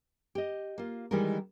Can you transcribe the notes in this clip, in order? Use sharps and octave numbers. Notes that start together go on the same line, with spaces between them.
G4 D#5
A#3 F4
D#3 E3 G3 G#3 D#4 A#4